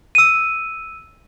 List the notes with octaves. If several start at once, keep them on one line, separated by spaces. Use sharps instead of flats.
E6 D#7